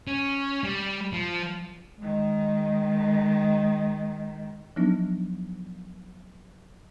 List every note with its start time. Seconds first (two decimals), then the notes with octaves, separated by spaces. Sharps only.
0.07 C#4
0.64 G3
1.13 F3
1.99 D#3 G#3
4.76 F3 F#3 B3 D4 D#4